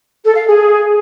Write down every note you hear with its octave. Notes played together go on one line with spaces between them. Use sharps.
A4
F5
G#4